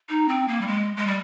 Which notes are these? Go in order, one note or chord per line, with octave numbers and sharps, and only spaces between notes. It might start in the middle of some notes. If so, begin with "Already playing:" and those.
D#4
C4
A#3
G3
G#3
G#3
G3